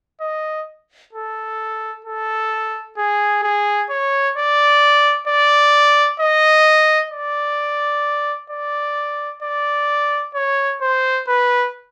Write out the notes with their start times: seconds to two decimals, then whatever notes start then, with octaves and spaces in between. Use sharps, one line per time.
0.21 D#5
1.13 A4
2.05 A4
2.97 G#4
3.43 G#4
3.89 C#5
4.36 D5
5.28 D5
6.20 D#5
7.12 D5
8.50 D5
9.43 D5
10.35 C#5
10.81 C5
11.28 B4